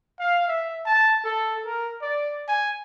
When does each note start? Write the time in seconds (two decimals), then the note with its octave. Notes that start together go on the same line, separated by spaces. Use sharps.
0.19 F5
0.48 E5
0.86 A5
1.24 A4
1.65 A#4
2.02 D5
2.48 G#5